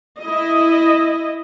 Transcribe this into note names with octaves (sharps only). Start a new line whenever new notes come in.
E4 D#5